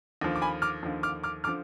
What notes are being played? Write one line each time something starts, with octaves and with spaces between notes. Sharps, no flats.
D#2 D3 F3
D6
G#5 B5
D6 F6
D#2 D3 F3
D6 F6
D6 F6
D3 F3 D6 F6